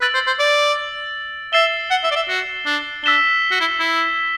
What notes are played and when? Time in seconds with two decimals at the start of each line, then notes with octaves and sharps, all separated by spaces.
0.01 B4 E6 A6 D7 F#7
0.14 C5
0.27 C5
0.39 D5
1.53 E5 A6 C7 E7 G7
1.90 F#5
2.03 E5
2.11 D5
2.16 E5
2.28 F#4
2.66 D4
3.04 D4 E6 B6 E7 G7
3.51 F#4
3.60 E4
3.80 E4